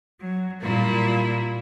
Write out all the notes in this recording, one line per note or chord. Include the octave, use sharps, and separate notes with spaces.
F#3
A#2 G3 A#3 E4